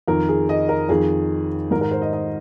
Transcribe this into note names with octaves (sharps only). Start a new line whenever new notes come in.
F2 D#3 A#4
G#4
D#5
A#4
F2 D#3 G#4
G#2 D#3 A#4
A#4
C5
D#5
D#5